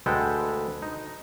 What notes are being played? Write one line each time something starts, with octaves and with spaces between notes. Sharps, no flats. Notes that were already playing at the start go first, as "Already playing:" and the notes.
D2 G#3 A4 B4 G5
D#4